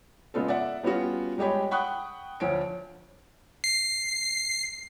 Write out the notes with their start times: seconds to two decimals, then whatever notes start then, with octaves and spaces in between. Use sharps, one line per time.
0.34 C#3 G#3 B3 F4 A4
0.48 D5 E5 F#5
0.83 G3 B3 C#4 F4 F#4
1.38 G3 G#3 G4 C#5 B5
1.71 F#5 G5 B5 C#6 D#6 F#6
2.40 D2 F3 C#5 D7
3.64 C7